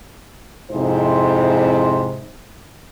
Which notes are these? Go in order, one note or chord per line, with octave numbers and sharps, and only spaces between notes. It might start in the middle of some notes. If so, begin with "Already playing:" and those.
F2 G#2 C3 E4 C5